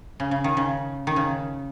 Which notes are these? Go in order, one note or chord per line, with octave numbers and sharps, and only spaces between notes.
C#3
C#3
D#3
C#3
D#3
C#3